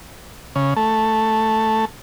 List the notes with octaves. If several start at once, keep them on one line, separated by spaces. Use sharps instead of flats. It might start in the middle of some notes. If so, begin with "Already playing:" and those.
C#3
A3